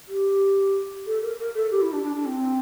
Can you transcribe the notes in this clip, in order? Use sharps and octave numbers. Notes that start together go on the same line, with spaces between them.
G4
A4
A#4
A#4
A4
G4
E4
D4
D4
D4
C4